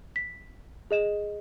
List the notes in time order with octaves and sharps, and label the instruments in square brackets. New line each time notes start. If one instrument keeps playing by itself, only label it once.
[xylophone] B6
G#4 D#5 E7